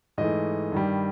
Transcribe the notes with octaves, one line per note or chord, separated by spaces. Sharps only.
G#2 E3 A3 D#5
G2 D#3 G3